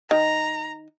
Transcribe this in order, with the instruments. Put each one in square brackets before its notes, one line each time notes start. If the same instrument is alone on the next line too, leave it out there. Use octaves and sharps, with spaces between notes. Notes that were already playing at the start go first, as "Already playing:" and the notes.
[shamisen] D#3 [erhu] A#5